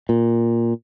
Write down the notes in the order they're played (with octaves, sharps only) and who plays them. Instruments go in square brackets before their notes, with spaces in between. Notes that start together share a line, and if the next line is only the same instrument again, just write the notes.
[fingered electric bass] A#2